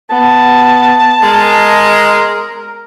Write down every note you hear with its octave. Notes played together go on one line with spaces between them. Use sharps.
B3 A5
G#3 A#4